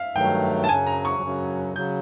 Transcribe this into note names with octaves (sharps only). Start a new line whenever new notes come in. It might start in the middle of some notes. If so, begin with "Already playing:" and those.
Already playing: E5 F5
G2 D#3 F#3 A3 G5
A5
F#2 C#3 F#3 G#5
A#5
C#6
F#2 C#3 F#3
C#3 F#3 G6